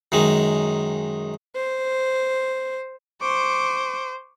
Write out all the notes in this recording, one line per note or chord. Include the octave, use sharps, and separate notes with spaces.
F#2 D#3 G#3
C5
C5 C#6 D6